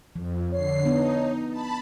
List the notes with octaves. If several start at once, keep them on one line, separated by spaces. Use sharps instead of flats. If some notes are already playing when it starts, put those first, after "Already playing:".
F2 F3
D3 C#5 C7
B3 D4 D#4
A5 B5